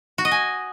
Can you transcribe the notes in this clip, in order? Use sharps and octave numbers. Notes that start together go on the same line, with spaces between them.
F#4
D#5
G#5